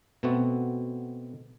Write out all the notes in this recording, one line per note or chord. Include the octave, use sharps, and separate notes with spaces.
B2 A3 B3 C4 F#4